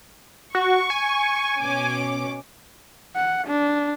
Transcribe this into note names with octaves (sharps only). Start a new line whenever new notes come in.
F#4 C#6
G#5
B2 C#4 D6
F#5
D4